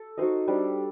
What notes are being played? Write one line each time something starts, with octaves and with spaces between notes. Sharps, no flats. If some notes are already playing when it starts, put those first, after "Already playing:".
Already playing: A4
D#4 F#4 C5 D#5
G3 D4 G4 C5